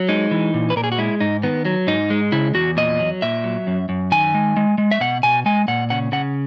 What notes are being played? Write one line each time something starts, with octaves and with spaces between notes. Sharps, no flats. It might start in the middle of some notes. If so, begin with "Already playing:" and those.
Already playing: F#3
G#3 D#4
E3
A#2
B4
A#2 A#4
G#4
F#4
G#3 E4
G#2 D#4
D#3 B3
F#3
G#2 D#4
G#3
C#3 E4
E2 F#4
A#2 D#5
F#3
A#2 E5
F#3
F#2
F#2
D#3 G#5
G#3
G#3
G#3
E5
B2 F#5
B2 G#5
G#3 G#5
A#2 F#5
C#3 F#5
C#3 F#5